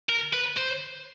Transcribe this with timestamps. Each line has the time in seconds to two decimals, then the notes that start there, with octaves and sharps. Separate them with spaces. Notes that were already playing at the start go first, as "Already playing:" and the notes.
0.09 A#4
0.33 B4
0.57 C5